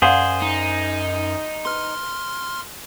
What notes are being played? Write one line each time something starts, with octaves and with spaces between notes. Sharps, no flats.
F#2 G#4 C5 D5 F5 F#5
D#4
B4 C6 F6